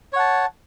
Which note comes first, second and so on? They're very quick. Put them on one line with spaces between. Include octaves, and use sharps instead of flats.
C#5 F#5 A5